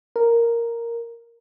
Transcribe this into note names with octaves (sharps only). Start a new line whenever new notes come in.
A#4